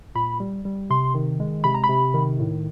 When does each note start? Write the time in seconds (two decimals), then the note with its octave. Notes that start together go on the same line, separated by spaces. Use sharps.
0.15 A#2 B5
0.40 G3
0.65 G3
0.90 C3 C6
1.14 D#3
1.40 G#3
1.64 C3 B5
1.74 A#5
1.84 B5
1.89 C3
2.14 D#3
2.39 A2